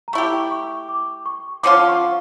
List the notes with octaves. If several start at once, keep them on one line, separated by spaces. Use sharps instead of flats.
A#5
A3 E4 G4 C#6
C#6
D6
C#6
D3 F3 C#4 F4 D6
C#6